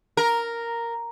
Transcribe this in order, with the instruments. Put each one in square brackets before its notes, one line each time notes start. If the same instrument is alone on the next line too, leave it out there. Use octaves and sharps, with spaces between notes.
[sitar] A#4